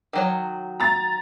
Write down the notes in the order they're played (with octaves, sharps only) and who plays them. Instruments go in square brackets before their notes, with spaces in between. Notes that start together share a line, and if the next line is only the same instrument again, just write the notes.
[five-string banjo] D#3 F#3 C#5
[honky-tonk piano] A#5 A6